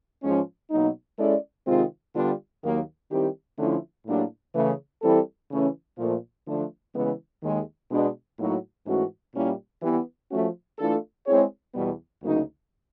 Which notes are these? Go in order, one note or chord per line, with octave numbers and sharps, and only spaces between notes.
G#2 F3 G#3 C#4
B2 F#3 A#3 D#4
G#3 C#4 E4 A4 D5
C3 D#3 G#3 C4 F4
D3 G3 B3 D4 F4
D#2 D#3 F#3 A#3
D#3 G3 C4 E4 G4
D3 F3 A3 C#4 E4
A2 F#3 A#3 D4 G4
C#3 E3 A3
E3 G3 C4 E4 A4
C#3 E3 A3 C#4
A#2 F3 A3
D3 F3 A3 D4
C#3 E3 G#3 B3
D#2 D#3 G#3
B2 G#3 B3 D4
A2 F#3 A#3 D#4 F#4
G#2 E3 A3 C#4 F#4
A#2 G3 A#3 C#4 E4
E3 G3 B3
F3 A3 C#4 F#4
E3 A3 D4 F4 A4
G#3 C4 E4 G#4 C#5
E2 B2 G3 B3
D2 C#3 F#3 A#3 D#4